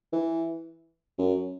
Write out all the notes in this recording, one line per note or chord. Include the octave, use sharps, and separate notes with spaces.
E3
F#2